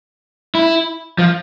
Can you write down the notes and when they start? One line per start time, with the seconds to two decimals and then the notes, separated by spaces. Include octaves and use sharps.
0.55 E4
1.18 F3